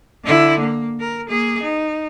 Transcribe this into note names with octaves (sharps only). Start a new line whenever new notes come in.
D3 E4
A#3
A#4
A#3 G#4
D#4